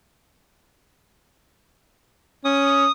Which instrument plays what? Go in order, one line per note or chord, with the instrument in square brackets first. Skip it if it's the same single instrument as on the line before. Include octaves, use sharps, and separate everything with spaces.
[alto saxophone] C#4 [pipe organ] D#6